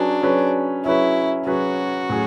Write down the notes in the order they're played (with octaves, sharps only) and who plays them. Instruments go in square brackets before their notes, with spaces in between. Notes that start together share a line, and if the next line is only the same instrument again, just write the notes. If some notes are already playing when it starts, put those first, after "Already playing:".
Already playing: [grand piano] F#3 C#4 G#4 B4 [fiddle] D4
[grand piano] F#3 C#4 G#4 B4
[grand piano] F#3 C#4 G#4 B4 [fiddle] E4
[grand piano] F#3 C#4 G#4 B4 [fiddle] F#4
[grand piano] A2 F#3 C#4 G#4